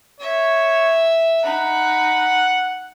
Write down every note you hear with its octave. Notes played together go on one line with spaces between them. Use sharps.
C#5 E5
D#4 F#5 B5